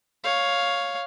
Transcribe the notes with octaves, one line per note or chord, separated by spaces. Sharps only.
C#5 F5